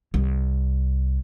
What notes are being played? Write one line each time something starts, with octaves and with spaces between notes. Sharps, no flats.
C2